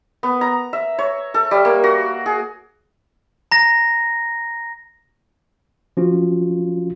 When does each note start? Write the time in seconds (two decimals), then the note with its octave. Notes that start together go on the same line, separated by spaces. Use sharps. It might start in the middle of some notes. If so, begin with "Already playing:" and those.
0.23 B3
0.41 A#5
0.73 E5
0.99 C#5
1.34 A4
1.51 G3
1.65 A#3
1.84 F#4
2.26 G#4
3.52 A#5 A#6
5.97 F3 C#4 F4 F#4